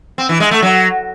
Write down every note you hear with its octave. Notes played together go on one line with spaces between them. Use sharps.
C4
E3
G#3
A3
F#3